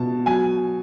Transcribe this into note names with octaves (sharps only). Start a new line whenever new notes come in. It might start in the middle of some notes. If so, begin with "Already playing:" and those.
Already playing: B2 A5
F#3 G#5